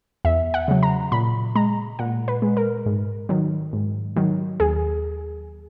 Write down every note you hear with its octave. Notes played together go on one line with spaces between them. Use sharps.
E2 E5
F#5
C#3 F#3
A#5
A#2 B5
G#3 A#5
A#2 F#5
B4
G#3
A#4
G#2
D#3 F#3
G#2
D#3 F#3
D#2 G#4